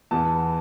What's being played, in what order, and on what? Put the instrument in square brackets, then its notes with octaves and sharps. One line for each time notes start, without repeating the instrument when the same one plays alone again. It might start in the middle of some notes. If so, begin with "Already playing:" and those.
[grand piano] E2 E3 B3 A5